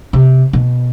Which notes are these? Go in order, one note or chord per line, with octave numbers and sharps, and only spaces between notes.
C3
B2